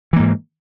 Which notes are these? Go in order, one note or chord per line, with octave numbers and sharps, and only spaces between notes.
G#2 E3 A#3